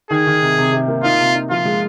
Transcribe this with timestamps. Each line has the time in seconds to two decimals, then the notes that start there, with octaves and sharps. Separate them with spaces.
0.10 D#3 G#4
0.27 D#3
0.42 C3
0.58 C3
0.73 C3
0.88 A#3
1.04 D#4 F4
1.20 C3
1.35 D#4
1.50 F3 F4
1.65 G#3